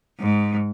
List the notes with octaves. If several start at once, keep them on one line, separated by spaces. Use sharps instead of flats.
G#2